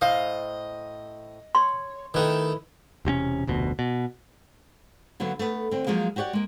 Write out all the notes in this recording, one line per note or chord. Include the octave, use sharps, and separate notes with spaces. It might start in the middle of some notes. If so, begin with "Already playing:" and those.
A2 C5 D#5 F5
C#5 C6
D#3 A3 E4 B4
E1 C3 C4 C#4
F1 D2 B2
B2
D3 F#3 A#3 B3
A3 B3
D3 C4
F3 F#3 G#3 A#3
F#4 G4 C#5 D5 F#5
G#3 A#3